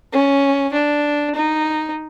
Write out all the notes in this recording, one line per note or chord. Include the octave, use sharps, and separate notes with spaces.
C#4
D4
D#4